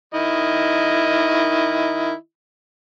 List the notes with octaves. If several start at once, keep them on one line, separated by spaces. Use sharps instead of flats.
D#3 E4 D#5